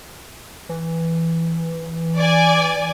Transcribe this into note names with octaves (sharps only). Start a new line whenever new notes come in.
E3
D5 G#5